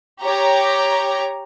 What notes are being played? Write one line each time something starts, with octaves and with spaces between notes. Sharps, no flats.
G4 C#5 A#5